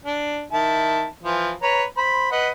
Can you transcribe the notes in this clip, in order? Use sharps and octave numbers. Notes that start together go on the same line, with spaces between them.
D4
D#3 E4 A5
E3 F3
B4 C#5 A#5
C5 B5
B4 D#5 F#5